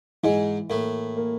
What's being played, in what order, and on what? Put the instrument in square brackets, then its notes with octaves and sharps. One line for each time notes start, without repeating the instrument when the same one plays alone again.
[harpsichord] G#2 G#3 [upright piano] E3
[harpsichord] A2 A3 [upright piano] A#3
[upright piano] A#3